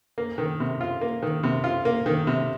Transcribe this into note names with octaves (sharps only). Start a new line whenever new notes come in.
A#3
D#3
C3
F4
A#3
D#3
C3
F4
A#3
D#3
C3